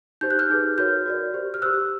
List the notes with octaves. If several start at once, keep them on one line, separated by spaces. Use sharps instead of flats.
D#4 G4 C5 G6
F#6
F6 G6
D#4 G#4 B4
F#4 A#4 C#5 F6 G6
F#4 A#4 D5
G4 C5
F6
G4 C5 E6 F#6